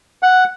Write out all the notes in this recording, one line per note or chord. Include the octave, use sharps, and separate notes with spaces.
F#5